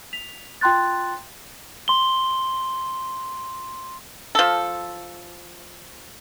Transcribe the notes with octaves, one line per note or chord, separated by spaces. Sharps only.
B6 F7
F4 G5 A#5 C6 F#6 A6
C6 G7
F3 A4